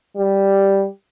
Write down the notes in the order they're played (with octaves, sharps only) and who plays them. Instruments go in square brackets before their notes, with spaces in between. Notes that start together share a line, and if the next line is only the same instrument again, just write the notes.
[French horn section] G3